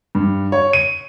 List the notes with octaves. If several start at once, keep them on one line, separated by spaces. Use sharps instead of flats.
G2
C#5
D#7